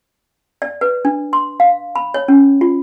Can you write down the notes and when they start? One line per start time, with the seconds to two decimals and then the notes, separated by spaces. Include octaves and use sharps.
0.62 D5
0.81 B4
1.05 D4
1.33 C6
1.60 F5
1.96 B5
2.14 C#5
2.28 C#4
2.61 F4